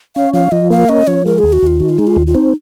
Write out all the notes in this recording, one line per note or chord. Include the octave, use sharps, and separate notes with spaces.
C#4 F5
F3 F5
F3 D#5
A#3 F5
C#4 D#5
F3 C#5
G#3 A#4
D#2 G#4
F#4
D#2 F4
D#3 F#4
F4
G#3 D#4
F4
D#2
F4
C4 D#4